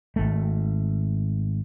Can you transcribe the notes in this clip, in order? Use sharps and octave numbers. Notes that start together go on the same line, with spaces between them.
G#1 A3